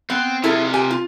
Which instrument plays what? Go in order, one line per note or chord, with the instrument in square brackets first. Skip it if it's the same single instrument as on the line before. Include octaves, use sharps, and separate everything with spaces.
[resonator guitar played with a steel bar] B3 [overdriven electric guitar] C4
[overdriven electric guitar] C3 F4 [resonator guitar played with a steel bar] E4 G#4 A4
[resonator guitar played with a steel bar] G4 G#5
F4